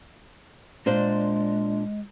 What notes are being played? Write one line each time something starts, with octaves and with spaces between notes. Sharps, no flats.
A#2 G#3 D4 C5